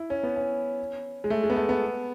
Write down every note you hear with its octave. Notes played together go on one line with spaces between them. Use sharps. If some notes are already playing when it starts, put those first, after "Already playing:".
Already playing: E4
C#4
B3
C#4
G#3
A3
G#3
B3
A3
B3